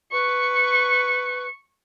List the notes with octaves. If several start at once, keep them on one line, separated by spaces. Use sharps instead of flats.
B4 C#6